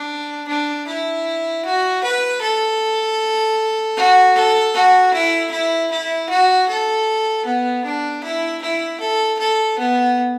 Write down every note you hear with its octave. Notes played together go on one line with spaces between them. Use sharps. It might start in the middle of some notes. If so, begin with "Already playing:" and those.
Already playing: D4
D4
E4
F#4
B4
A4
F#4
A4
F#4
E4
E4
E4
F#4
A4
B3
D4
E4
E4
A4
A4
B3